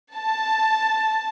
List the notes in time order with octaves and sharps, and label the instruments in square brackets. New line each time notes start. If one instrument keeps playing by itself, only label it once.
[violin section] A5